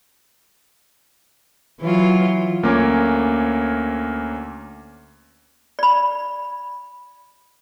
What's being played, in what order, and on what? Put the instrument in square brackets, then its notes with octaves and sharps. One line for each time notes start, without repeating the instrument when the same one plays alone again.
[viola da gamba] E3 F#3 F4
[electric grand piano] D2 A#3 C#4 C#5 D6
[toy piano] D5 B5